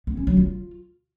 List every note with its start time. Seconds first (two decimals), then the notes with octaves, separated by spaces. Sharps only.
0.07 B3
0.17 C#4
0.27 F#3
0.37 F4